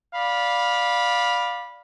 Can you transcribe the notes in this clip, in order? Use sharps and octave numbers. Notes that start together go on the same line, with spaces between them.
D5 F5 B5